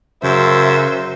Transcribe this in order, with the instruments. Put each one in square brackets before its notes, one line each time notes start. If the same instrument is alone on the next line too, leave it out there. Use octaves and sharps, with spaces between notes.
[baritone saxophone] F#2 [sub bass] C#3 [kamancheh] C5 E5